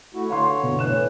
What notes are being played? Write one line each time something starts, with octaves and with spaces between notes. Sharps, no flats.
A3 E4 F#4
D3 C#5 F5 C6
G1 B2
A2 E3 C#5 F#6 E7